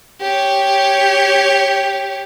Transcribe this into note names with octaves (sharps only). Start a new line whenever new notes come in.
G4 C#5